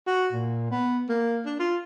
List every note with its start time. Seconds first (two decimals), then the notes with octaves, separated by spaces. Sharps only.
0.07 F#4
0.33 A#2
0.71 B3
1.09 A#3
1.46 D4
1.59 F4